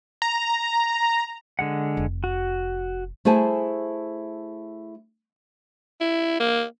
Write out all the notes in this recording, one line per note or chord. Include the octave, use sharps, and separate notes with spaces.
A#5
D3 G#3 F#5
F1
F#4
A3 E4 G#4 C5 G#5 A5
E4
A#3